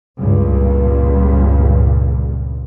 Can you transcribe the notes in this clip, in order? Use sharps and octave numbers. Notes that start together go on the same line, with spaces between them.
C#2 G2 A#2